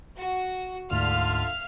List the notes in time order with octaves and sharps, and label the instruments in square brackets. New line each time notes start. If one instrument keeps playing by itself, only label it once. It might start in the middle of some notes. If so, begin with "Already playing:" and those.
[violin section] F#4
[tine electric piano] D2 G#2 [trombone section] D3 F4 [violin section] E5 F5 F6